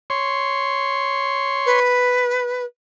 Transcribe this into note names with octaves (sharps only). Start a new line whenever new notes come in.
C#5 C6
B4